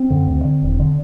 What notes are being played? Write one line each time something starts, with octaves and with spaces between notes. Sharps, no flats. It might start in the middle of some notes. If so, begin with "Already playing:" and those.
Already playing: C4
F#2 D3
D2
D3
E1
D3